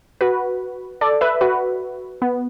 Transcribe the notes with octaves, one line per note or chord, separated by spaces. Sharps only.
F#4 B4
A4 D5
B4 E5
F#4 B4
B3